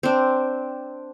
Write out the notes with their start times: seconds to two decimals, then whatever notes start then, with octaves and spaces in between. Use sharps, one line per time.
0.03 C4 D4